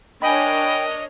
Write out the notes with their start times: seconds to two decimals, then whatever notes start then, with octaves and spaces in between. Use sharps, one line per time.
0.22 D4 A#4 C#5 D#5 G5 G#5 B5